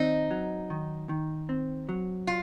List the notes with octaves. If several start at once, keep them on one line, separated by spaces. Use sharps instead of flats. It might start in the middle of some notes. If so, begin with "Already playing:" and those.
Already playing: D#3 C4 D#4
F#3
D#3
D#3
C4
F#3
F4